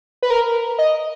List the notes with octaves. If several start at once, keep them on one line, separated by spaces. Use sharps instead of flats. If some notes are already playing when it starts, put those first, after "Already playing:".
B4
A#4
D#5